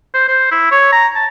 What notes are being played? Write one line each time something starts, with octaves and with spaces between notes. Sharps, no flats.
C5
C5
E4
C#5
A#5
A5